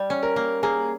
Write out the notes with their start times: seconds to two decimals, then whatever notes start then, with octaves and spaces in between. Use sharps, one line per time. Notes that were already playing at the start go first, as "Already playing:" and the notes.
Already playing: G3
0.10 C#4
0.23 A#4
0.36 A#3
0.63 A#3 G#4